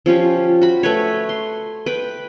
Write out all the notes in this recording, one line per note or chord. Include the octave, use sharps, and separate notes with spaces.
F3 C#4 F4 G4
F#4 B5
A3 B4 C#5
C6
B4 G5